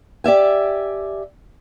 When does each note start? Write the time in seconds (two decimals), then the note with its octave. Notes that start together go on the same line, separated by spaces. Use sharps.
0.24 G4 D5 E5 G#5